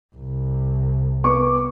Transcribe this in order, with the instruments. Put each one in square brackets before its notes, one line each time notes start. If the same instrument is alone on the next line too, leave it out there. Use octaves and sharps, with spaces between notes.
[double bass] C2
[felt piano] B3 C#6 D6